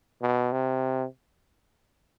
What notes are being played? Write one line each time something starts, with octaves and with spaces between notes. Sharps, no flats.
B2
C3